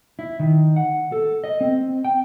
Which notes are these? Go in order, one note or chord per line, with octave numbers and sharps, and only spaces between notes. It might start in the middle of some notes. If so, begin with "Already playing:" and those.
E4
D#3
F#5
A4
D#5
C4
G5